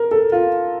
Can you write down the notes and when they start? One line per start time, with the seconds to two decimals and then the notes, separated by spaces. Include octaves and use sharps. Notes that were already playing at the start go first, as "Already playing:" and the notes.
Already playing: A#4
0.11 A4
0.32 F4